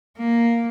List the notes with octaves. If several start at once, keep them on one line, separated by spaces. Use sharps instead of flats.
A#3